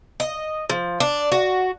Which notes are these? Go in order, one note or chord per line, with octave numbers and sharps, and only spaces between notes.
D#5
F3
D4
F#4